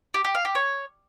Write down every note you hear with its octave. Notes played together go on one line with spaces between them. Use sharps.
G4
G4
F5
G4
C#5